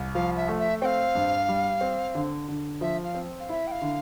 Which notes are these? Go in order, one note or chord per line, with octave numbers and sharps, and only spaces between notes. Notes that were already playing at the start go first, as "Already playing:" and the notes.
Already playing: C2
F3 F5
E5
A3
E5
C4 F5 G5
G2
G3
C4
D3
D3
F3 E5
F5
C4
F5
E4 E5
G5
F5
D3